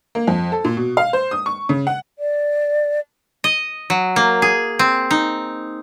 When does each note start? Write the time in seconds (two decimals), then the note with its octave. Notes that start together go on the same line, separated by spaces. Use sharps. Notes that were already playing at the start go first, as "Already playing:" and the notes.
0.15 A#3
0.28 F2
0.52 A4
0.65 A#2
0.77 B2
0.97 F5
1.13 C5
1.31 D#6
1.46 C#6
1.69 C#3
1.87 F#5
2.19 D5
3.44 D#5
3.90 F#3
4.16 A#3
4.42 G#4
4.79 C4
5.11 D#4